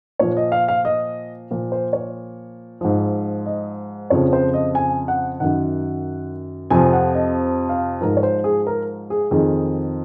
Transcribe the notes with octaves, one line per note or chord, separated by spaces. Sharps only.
A#2 F3 C#5
D#5
F5
F5
D#5
A#2 F3
C5
C#5
G#2 F3
D#5
F2 C#3 F3 C#5
C5
D#5
G#5
F#5
F#2 D#3 F#5
F2 C3 F3 G#5
F#5
D#5
F5
G#2 F3 A#4
C#5
C5
G#4
A#4
G#4
F2 D#3 G#4